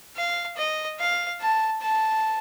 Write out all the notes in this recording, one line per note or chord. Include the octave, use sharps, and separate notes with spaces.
F5
D#5
F5
A5
A5